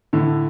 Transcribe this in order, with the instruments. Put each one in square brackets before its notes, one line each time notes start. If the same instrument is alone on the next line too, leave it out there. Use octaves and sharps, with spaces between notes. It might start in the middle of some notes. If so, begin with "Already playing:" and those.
[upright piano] A2 D3